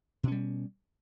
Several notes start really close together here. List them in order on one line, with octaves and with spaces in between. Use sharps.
B2 C#4 G3